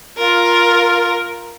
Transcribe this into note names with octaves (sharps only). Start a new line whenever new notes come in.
F4 A#4